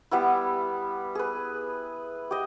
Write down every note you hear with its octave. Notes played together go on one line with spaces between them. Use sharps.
G3 B3 E4
G#4 B4
G4 D#5